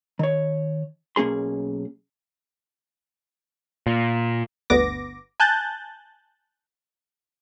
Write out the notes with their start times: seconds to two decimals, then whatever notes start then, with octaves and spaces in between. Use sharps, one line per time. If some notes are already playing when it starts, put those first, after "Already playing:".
0.19 D#3 C#5
1.16 B1 A#3 C#4 G#4 C6
3.87 A#2
4.70 G1 D2 B3 D6 A#6
5.40 G#5 A5 F#6 G6 A6